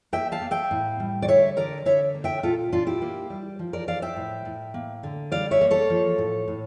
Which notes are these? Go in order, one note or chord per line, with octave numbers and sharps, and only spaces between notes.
A#3 E5 G5
F5 A5
A#3
E5 G5
A2
G3
D5
D3 C#5 E5
D3 A#4 D5
D3 C#5 E5
A#3
E5 G5
A#2 F4 A4
A#2 D4 F4
E4 G4
A#3
G3
F3
A#4 D5
F3 D5 F5
E5 G5
A2
A2
A#3
D3
G3 D5 F5
C#5 E5
A#3
A4 C#5
F3
A2
A2